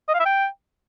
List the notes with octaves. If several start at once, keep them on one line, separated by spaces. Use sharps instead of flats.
D#5
F5
E5
G5